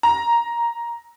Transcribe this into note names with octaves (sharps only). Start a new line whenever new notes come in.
A#5